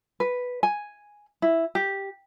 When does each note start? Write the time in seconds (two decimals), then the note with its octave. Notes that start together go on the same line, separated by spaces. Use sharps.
0.20 B4
0.63 G#5
1.42 E4
1.75 G4